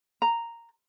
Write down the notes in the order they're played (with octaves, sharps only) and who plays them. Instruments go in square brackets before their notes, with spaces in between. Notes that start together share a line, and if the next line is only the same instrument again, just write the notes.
[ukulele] A#5